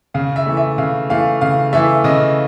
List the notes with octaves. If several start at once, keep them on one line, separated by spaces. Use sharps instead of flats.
C#3 F5
E5
E3 A3
E5
C#3 F5
E3 A3 F5
C#3 F5
E3 A3 E5
C#3 D#5